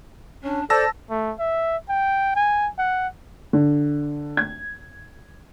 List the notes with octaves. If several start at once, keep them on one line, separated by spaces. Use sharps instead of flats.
C#4 D4
A4 C5 D5 A5 E6 A#6
A3
E5
G5
G#5
F#5
D3
G#6